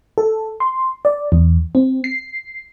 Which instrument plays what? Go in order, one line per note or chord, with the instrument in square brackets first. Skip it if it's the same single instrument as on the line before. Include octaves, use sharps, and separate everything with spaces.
[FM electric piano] A4
C6
D5
E2
C4
C7